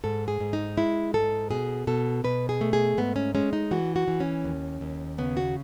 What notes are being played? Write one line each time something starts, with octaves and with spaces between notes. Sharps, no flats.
G#2 A4
G#4
G#2
D#4
G#3 E4
G#2 A4
B2 G#4
B2 A4
B2 B4
G#4
A3
G#4
G#2 B3
C#4
G#3 C#4
D#4
E3 F#4
F#4
E3
C#4
D#2
D#2
C#3 B3
F#4